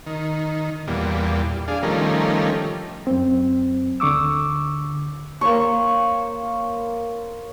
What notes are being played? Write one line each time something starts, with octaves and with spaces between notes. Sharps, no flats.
D#3
E2 A#2 G3
D4 G#4 F5
D#3 F3 G3 A3 C#4 A#4
F#2 C4
D2 D3 C#6 D6 E6
A#3 C5 C#5 C#6